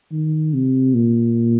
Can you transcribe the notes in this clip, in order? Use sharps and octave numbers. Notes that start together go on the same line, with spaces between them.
D#3
C3
A#2